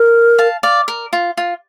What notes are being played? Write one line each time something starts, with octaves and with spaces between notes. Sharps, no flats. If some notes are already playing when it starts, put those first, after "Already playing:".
Already playing: A#4
F5 A5
D5 F5
A#4
F4
F4